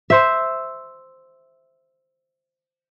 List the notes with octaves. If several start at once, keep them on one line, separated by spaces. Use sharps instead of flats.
C5 E5